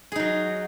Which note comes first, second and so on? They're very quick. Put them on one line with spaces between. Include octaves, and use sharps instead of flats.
G#4 D#4 F#3